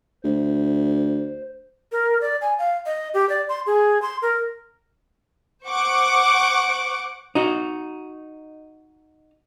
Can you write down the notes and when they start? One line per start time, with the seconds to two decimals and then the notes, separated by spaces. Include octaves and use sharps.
0.24 D2 C5
1.92 A#4
2.21 D5
2.41 G#5
2.59 F5
2.86 D#5
3.14 G4
3.29 D5
3.49 C6
3.66 G#4
4.02 C6
4.22 A#4
5.67 C5 F#5 C#6 D6
7.35 D#4 F#4